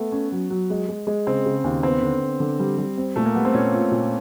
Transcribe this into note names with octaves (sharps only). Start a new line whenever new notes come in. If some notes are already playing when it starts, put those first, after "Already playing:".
Already playing: A3 B3
C#4
F#3
F#3
G#3
G#3
G#3
C#3 C4
C#3
D#2
B3 C4
D3
B3
D3
G3
G3
C4
A#2 A3
A#3
G3 B3
C4
A#2 C#4
F4
A#2